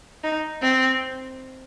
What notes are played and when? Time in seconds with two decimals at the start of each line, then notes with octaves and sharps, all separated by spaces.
0.23 D#4
0.62 C4